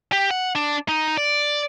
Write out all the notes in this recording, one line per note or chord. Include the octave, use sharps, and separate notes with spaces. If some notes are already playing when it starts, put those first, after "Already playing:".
G4
F#5
D4
D#4
D5